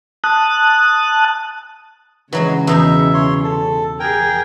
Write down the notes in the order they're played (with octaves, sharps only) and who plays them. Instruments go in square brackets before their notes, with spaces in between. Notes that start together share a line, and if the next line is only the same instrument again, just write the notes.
[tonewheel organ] A5 D#6 F#6
[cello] C#3 [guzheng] E3 F#3 G#3 [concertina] F#4
[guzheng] E2 B2 D#4 [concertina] E5
[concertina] C#5 C6
A4
[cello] G#4 [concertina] A#4 G5